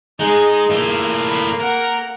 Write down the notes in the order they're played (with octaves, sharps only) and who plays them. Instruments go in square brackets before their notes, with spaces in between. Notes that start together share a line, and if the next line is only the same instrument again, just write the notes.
[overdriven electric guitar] G#3 [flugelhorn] D#4 [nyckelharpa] G#4
[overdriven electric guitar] A2 F4 [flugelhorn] A#3 [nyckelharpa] E5
[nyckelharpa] B5
[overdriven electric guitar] A#4 [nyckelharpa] F#5